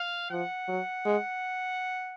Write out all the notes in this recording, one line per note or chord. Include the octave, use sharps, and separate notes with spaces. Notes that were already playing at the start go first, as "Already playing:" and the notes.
Already playing: F5
F3 F#5
F#3
G#3